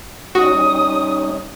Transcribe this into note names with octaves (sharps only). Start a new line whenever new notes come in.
G3 C#4 D#4 F#4 D#6